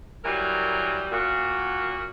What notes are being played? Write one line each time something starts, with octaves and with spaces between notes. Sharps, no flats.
E3 F#3 G3 A#4
A#2 F#4